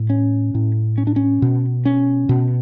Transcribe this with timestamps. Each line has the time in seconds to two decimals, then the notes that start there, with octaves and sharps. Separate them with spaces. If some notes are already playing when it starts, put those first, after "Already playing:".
Already playing: A2
0.10 C#4
0.55 A2
0.98 C#4
1.07 D4
1.16 C#4
1.42 B2
1.85 C#4
2.29 B2